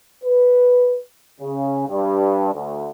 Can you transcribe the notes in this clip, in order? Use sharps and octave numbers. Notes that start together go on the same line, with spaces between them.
B4
C#3
G2
D2